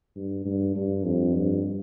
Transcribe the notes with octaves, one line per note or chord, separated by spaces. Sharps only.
G2
G2
G2
F2
G2